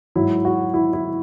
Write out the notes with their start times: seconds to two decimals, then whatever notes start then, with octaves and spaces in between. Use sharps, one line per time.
0.16 G#2 F#3 E4
0.45 F#4
0.74 E4
0.93 E4